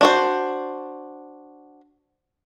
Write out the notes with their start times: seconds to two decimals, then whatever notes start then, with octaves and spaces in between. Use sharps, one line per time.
0.01 D4 F#4 C5